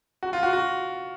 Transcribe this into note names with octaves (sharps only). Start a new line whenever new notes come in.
F#4
F4
F#4
F#4